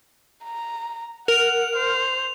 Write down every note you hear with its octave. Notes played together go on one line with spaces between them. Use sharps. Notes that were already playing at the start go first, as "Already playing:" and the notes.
A#5
A#4 F#5 F7
C5